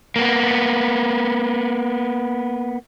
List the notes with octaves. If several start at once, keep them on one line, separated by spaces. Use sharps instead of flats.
A#3 B3